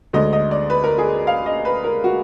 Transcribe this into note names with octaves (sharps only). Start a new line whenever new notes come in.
D2 D3 G#3 D#5
D#5
D5
B4
A#4
G#4
F5
D#5
B4
A#4
F#4